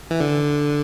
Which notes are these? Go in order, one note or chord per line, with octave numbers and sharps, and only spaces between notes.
E3
D3